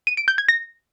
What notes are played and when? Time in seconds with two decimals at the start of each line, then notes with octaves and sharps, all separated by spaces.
0.07 D#7
0.17 D7
0.28 G6
0.38 G#6
0.48 A#6